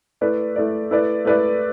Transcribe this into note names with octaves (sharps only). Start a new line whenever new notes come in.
A3 E4 B4 D5
A3 E4 B4 D5
A3 E4 B4 D5
A3 E4 B4 D5